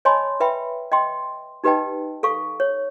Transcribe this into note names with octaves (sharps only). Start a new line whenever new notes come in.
C#5 D#5 G#5 A5 B5 C6
B4 E5 G5 B5
D#5 G5 C6
D#4 G4 B4 D#5 G5 A5
A4 F5 C#6
C#5